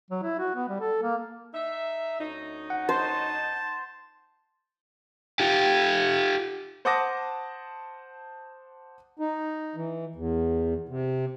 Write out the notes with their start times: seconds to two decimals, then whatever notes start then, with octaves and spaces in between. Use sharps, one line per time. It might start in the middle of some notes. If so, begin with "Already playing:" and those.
0.11 F#3
0.23 E4
0.39 F#4
0.56 B3
0.69 G3
0.80 A4
1.03 A#3
1.54 D#4 E5
2.20 D2 C#4 D#4
2.70 F#5
2.89 C5 A5
5.40 F4 G4
6.85 C5 F#5 A5 D6 D#6 A#6
9.19 D#4
9.76 E3
10.16 E2
10.89 C3